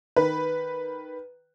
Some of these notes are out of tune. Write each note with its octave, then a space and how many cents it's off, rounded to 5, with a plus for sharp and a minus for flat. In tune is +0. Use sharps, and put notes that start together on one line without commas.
D#3 +0 B4 +0